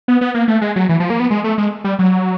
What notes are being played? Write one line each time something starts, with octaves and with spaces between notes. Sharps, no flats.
B3
B3
A#3
A3
G#3
F#3
E3
F3
A#3
B3
G#3
A3
G#3
G3
F#3